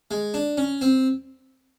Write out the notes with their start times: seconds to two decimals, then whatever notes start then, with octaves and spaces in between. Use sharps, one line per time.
0.11 G#3
0.34 D4
0.57 C#4
0.81 C4